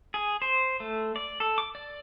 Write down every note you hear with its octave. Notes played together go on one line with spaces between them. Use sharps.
G#4
C5
A3
D5
A4
D6
D5